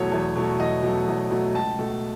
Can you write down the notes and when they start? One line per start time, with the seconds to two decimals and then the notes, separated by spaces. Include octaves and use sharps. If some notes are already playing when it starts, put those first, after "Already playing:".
Already playing: E2 B2 F#3 A3 C#5
0.12 E2
0.36 B2 F#3 A3
0.59 E2 D#5
0.83 B2 F#3 A3
1.07 E2
1.31 B2 F#3 A3
1.54 C#2 A5
1.79 B2 A3